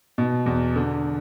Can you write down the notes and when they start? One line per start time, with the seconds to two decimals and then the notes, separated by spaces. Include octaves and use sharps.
0.18 B2
0.46 E2
0.76 D3